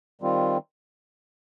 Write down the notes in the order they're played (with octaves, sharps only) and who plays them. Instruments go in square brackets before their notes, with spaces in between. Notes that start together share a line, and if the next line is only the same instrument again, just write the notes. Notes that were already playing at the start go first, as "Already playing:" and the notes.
[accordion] D#3 G3 C4 F4